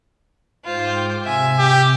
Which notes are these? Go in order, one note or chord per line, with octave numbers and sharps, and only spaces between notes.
G#2 F4 C5 G5 D6
C3 E5 G#5
G4